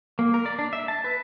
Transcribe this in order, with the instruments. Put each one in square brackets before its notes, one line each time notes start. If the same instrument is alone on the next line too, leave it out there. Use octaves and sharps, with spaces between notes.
[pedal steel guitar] A#3
A#4
D5
D4
E5
A5
B4